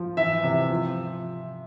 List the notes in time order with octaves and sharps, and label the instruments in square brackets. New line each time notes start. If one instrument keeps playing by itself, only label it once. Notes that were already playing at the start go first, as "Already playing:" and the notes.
Already playing: [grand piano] F3
E3 E5
C3
F3